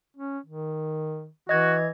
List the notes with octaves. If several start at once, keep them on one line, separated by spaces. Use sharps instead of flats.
C#4
D#3
E3 F#4 D#5 G#6